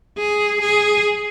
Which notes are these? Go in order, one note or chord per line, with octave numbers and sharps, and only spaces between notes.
G#4
G#4